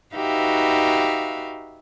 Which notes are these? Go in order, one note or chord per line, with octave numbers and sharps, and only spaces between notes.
D#4 F#4 G4 B4 E5 F5